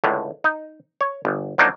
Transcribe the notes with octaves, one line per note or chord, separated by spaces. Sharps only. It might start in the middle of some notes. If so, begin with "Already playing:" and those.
C#2 A2 D3
D#4
C#5
G1
F3 F#3 A#3 D4 D#4